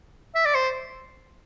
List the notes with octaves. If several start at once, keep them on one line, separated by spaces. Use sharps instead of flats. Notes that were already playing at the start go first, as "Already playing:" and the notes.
E5
D5
C5